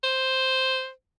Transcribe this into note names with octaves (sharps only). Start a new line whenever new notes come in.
C5